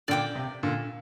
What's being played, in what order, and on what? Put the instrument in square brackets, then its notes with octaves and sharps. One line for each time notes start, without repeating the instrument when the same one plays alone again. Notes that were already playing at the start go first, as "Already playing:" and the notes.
[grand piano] A#2 D3 [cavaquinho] D5 G5 D6
[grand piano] C3
A#2 D3